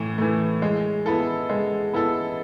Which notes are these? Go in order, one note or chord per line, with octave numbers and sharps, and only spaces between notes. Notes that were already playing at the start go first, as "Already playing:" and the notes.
Already playing: A2 E3
E3 A3
G#3
B3 E4 A4
G#3
B3 E4 A4